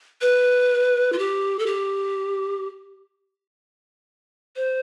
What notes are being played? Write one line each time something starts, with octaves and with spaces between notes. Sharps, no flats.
B4
F4
G4
A4
G4
C5